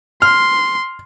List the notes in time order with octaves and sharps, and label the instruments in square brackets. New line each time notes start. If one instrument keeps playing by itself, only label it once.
[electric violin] C6 [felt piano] F6